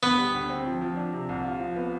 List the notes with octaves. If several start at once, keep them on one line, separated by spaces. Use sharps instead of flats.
D2 B3
G3
D2
C4
F3
F3
D4
C3
C2
F4
F3
B3